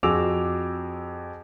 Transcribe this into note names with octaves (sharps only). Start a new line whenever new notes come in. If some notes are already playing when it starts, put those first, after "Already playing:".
F2 F#4 G#4 D6 E6 F7